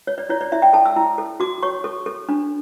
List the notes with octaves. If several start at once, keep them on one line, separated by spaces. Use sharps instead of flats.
C#5
D5
E4 C#5
D5
E4 E5
G5
A4 A5
E6
E4
A4
F#4 D6
C#5 C#6
A4
A4
D4